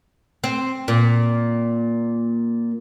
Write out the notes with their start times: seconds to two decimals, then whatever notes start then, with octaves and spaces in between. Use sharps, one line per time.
0.44 C4
0.88 A#2